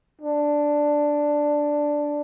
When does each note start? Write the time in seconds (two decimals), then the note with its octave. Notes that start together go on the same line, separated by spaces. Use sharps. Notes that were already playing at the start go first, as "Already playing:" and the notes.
0.21 D4